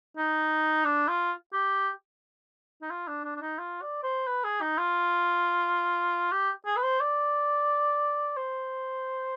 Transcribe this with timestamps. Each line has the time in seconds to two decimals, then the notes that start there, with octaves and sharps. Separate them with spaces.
0.17 D#4
0.85 D4
1.08 F4
1.53 G4
2.82 D#4
2.90 F4
3.08 D4
3.24 D4
3.36 D4
3.41 D#4
3.58 F4
3.82 D5
4.03 C5
4.27 B4
4.44 G#4
4.61 D#4
4.78 F4
6.32 G4
6.66 G#4
6.77 B4
6.83 C5
7.00 D5
8.37 C5